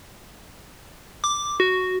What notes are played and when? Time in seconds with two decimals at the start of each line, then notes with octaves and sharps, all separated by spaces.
1.24 D6
1.60 F#4